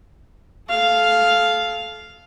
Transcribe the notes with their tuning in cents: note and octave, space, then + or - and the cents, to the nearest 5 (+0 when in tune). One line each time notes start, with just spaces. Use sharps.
A4 -30 F5 +0